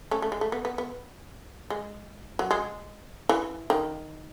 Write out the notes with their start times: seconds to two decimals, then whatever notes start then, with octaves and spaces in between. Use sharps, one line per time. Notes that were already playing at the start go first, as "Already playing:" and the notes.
0.11 A3 C#4
0.22 A3
0.32 G#3
0.41 A3
0.52 B3
0.65 B3
0.78 B3
1.70 G#3
2.39 F#3
2.51 G#3
3.29 E3
3.70 D#3